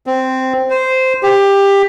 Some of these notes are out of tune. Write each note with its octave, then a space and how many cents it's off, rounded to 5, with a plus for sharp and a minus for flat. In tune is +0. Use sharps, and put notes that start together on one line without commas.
C4 -5
C5 -10
G4 +15